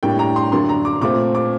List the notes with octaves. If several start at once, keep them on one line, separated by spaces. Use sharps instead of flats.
A2 G3 A#3 D4 G5
A#5
C6
F#2 D3 F#3 A#3 D4 C6
A#5
D6
A#2 A3 C4 D6
D6